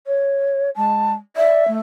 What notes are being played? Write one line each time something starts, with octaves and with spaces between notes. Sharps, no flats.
C#5
G#3 A5
D5 E5
A3